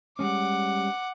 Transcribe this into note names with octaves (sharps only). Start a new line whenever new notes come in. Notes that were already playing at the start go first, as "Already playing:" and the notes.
G3 G#3 C#4 F#5 D6